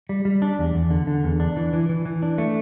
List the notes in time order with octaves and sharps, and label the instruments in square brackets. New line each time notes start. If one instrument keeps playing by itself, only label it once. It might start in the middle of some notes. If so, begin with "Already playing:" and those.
[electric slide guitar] G3
G3
D4
E2
E2
D3
D3
E2
D4
E3
E3
E3
E3
D4
A3